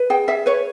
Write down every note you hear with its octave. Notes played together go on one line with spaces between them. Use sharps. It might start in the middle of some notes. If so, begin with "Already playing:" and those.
Already playing: B4
G#4 G5
G#4 E5
B4 C#5